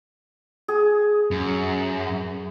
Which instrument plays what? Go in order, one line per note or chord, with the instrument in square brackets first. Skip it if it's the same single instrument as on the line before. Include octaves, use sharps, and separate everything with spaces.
[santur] G#4
[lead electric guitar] F#2